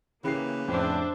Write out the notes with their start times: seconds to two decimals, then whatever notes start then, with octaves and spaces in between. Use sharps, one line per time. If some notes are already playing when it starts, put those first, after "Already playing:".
0.24 C#3 E3 A#3 G4 B4 C7
0.68 F2 A2 D4 C5 E5